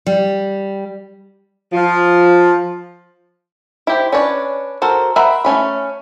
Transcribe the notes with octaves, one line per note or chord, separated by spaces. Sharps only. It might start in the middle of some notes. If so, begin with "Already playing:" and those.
G3
F3
E4 G4 C5
C#4 D4 B4 C#5 D5
F#4 A4 A#4 C5
A#4 C5 E5 F#5 B5
A3 C#4 B5